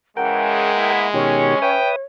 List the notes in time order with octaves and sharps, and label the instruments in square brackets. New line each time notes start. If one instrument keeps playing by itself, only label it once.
[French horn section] C#3 E3 [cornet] G#3 [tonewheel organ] A#4 G5 [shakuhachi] F#5
[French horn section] A#3 B3 E4
[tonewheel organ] B2 D#3 G4 [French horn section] C#4 [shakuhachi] C#5
[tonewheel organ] B4 E5 D#6 [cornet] G5